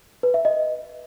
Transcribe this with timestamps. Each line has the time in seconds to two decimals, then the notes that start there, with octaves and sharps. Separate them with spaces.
0.23 B4
0.34 E5
0.45 D#5